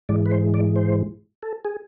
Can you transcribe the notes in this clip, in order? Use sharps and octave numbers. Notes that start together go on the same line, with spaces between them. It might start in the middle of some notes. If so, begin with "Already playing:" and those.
G#2 E3 G#3 D5
B4
C5
D5
C5
A4
G#4